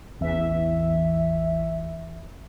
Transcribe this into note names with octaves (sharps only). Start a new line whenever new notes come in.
A1 E2 E3 E5